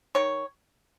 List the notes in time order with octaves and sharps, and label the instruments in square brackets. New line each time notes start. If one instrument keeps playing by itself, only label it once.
[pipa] D#3 C#5